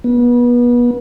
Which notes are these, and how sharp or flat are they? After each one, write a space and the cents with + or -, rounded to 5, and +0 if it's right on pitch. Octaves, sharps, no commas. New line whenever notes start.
B3 -30